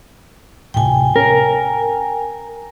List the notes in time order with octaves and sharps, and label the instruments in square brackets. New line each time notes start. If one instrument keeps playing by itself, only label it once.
[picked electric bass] D1 A2 C3 [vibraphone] G5 G#5
[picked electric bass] C#4 [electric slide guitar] A#4